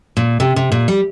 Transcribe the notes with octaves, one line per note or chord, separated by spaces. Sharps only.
A#2
C3
C3
A#2
G3